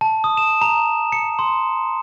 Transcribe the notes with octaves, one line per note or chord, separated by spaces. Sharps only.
A5
D#6
E7
A#5
C#7
C6